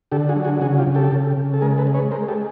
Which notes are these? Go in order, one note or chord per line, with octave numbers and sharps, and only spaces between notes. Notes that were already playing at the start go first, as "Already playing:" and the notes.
D3 G4 A4
F#4 G#4
F#3
F#4 G#4
C#3 F#4 G#4
F4 G4
C#3
G4 A4
C#3
C#3
A4
G#3 G#4 A#4
A4 B4
G#3
B4 C#5
G#3 A#4 C5
G4 A4